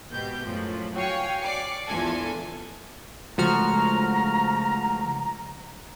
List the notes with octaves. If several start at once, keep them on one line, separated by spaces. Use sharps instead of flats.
G#1 B2 G4 G6
F#2 A2 F3 F#3
F#4 C#5 F5 G5 G#5 C#6
D5 D6 C7 C#7
A#1 E2 D4 F4 A4 G#5
C#3 F3 G#3 A3 F#4 A#5 F6